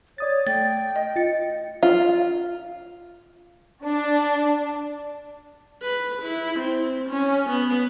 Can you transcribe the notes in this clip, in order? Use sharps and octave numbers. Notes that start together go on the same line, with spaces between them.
C#5 D5 D#6 A6
A3 G5 A6
D#5
F4 A6 C#7
F4
D4
B4
E4
C4
C#4
B3